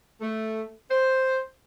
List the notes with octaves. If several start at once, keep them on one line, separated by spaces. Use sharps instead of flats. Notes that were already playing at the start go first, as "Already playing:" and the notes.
A3
C5